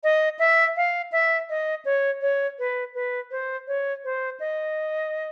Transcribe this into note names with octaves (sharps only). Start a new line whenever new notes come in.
D#5
E5
F5
E5
D#5
C#5
C#5
B4
B4
C5
C#5
C5
D#5